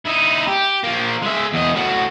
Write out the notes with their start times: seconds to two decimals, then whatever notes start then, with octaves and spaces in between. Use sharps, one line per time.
0.06 D#4 E4
0.47 G4
0.83 F3 A#3
1.22 G#3 E5
1.53 E2 D#5
1.74 A2 F#4